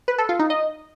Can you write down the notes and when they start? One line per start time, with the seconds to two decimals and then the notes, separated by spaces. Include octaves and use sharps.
0.08 B4
0.18 A4
0.29 F4
0.39 D#4
0.50 D#5